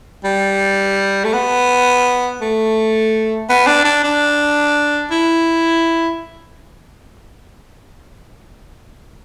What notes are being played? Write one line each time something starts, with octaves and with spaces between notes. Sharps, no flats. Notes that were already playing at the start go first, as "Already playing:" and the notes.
G3
A3
B3
A3
B3
D4
D4
D4
E4